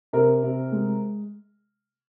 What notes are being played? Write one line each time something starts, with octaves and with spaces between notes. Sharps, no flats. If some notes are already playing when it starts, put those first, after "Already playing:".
C3 A#4
C3
G#3